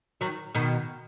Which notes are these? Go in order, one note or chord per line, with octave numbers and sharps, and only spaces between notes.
D#3 F#3
B2 D#3